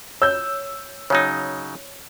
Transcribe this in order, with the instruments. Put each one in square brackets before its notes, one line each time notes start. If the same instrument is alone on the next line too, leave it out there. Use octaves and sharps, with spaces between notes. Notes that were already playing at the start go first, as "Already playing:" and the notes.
[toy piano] C#5 [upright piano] E6 G6
[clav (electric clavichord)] C#3 F#3 D#4 [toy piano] C#5